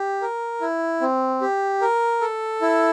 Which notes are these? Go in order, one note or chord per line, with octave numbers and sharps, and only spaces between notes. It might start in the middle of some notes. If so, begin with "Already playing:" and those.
Already playing: G4
A#4
E4
C4
G4
A#4
A4
E4